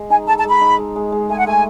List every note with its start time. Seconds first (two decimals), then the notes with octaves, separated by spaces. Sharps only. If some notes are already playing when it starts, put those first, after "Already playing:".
Already playing: G#3
0.10 D#4 G#5
0.27 A4 A5
0.39 A5
0.44 G#3
0.50 B5
0.61 D#4
0.79 G#3
0.96 G#3
1.12 G#3
1.29 A3 G#5
1.38 F#5
1.47 A3 G#5